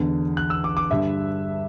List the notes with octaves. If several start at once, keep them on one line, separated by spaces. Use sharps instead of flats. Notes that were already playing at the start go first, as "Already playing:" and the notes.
Already playing: E2 D3
F#6
E6
D6
D6
G2 D3 E5